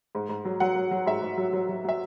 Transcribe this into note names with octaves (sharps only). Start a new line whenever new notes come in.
G#2
G#2
F#3
F#3 F#5
F#3
F#3
G#2 E5
G#2
F#3
F#3
F#3
F#3 E5